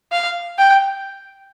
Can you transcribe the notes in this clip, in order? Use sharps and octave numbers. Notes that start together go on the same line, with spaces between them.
F5
G5